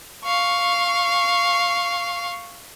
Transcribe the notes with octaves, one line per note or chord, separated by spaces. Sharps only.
F5 C#6